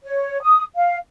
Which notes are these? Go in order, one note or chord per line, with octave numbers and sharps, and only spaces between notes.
C#5
D#6
F5